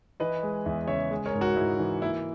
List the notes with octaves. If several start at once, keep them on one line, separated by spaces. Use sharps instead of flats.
E3 B4 D#5
G#3
E2 E5
C#3 C#5 E5
G#3
A#4 C#5
G#2
F#4 A#4
G#2 E4
E3
A#3 E4